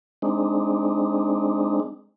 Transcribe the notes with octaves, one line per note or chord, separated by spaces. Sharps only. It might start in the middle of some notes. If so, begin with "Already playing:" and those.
G#3 C4 D4 D#4